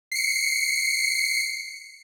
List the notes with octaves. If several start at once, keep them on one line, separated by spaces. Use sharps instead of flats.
C7 C#7